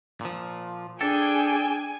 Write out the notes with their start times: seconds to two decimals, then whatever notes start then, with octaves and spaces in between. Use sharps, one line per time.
0.21 A#2 F3
1.01 D4 G#4 A4 G5 G#5